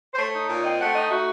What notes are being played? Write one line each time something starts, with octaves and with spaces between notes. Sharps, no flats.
C5
A3 C#5
D#4
A#2
C4 D#5
A3 F#5
D#4 D#5
A3 F#4